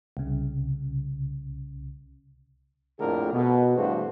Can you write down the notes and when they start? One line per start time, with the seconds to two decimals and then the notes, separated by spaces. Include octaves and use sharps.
0.17 C2 C#3
2.99 A#1 F2 A2 D3 G#4 A#4
3.33 B2
3.76 E2 G2 A3 F#4 G#4 C5